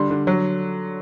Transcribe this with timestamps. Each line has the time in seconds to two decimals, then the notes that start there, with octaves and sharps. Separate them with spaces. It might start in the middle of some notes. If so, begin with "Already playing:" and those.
Already playing: D3 G3 C6
0.10 D3
0.27 F#3